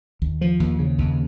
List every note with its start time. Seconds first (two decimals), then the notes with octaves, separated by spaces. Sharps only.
0.22 D#2
0.41 F3
0.60 D#2
0.79 C#3
0.99 D#2